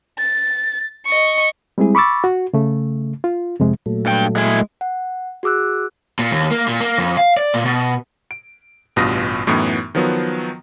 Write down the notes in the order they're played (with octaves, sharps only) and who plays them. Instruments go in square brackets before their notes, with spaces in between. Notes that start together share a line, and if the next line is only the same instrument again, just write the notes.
[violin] A6
D#5 C#6
[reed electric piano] G3 G#3 C4 E4 G#4
B5 C#6 D6 E6 A6
F#4
C#3 A3
F4
F2 C3 G#3
[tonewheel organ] A#2 F#3 A3
[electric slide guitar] G2 G5
G#3 E4 G#4
[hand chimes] F#5
F#4 G#4 D6 E6 F#6
[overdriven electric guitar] A#2
D#2
A#3
A#2
A#3
F2
F5
D5
A#2
B2
[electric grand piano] D7
A1 G2 B2 F4 D#6 A#6
F#2 A2 E3 B3 D#4
D#3 F3 F#3 B3